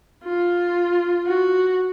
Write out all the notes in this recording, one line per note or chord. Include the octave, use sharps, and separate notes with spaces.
F4
F#4